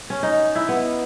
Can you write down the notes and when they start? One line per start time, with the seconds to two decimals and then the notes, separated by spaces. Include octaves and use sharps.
0.10 C#4
0.23 D#4
0.55 E4
0.69 B3